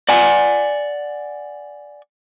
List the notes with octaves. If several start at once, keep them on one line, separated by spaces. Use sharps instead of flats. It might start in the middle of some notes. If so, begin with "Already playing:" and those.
D5 F#5 G#5